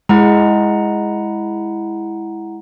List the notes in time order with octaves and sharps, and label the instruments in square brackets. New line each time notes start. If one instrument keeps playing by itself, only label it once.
[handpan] G#3 [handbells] E4 F#5 A#5